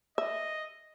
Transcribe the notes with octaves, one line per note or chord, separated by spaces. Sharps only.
D#5 E5